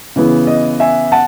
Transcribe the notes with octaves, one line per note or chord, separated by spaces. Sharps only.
C#3 E3 B3
D#5
E5 G#5
F#5 A5